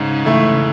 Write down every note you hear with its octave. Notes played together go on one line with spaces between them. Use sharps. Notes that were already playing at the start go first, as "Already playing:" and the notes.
Already playing: G#2 C#3
E3 A3 E4